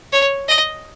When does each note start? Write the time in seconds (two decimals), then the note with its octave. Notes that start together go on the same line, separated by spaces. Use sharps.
0.12 C#5
0.48 D#5